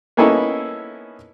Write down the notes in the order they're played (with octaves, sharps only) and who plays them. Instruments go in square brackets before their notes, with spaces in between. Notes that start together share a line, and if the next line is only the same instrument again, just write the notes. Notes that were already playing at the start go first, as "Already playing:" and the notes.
[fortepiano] A#3 B3 C#4 D#4 E4 A4